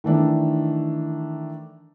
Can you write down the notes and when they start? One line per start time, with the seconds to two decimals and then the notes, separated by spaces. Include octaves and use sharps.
0.04 D#3 E3 A3 D4